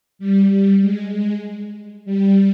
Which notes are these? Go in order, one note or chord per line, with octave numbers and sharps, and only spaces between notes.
G3
G3
G#3
G#3
G3